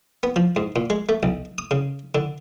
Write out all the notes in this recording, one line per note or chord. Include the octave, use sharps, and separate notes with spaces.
B3
F3
G#2
A#2
G#3
A3
B1
D#6
C#3
D3